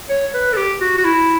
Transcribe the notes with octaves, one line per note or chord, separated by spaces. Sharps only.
C#5
B4
A4
G4
F#4
F#4
E4